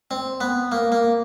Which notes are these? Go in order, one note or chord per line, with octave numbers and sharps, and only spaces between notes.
C4
B3
A#3
A#3